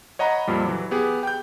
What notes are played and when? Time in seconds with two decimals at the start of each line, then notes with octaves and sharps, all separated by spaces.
0.19 C#5 D#5 F#5 A#5 B5
0.47 F2 A#2 G3
0.65 E3 F#3
0.91 B3 G4 G#4
1.23 G5 G6